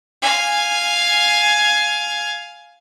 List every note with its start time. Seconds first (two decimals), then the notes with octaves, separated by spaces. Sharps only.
0.22 F5 G#5